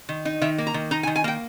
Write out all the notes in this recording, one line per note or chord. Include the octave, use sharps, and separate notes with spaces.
D#3
D#4
D#3 E5
A#3
A#5
D#3
D#4 A#5
G#5
D#3
G#5
A#3 G5